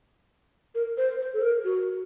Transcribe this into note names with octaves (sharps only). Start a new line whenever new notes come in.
A#4
C5
C5
A4
A#4
F#4